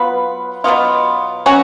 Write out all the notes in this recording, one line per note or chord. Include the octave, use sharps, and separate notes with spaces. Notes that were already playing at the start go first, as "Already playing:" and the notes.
Already playing: F#3 B3 F4 B4
B2 F#3 B3 F4
F#3 C#4 F#4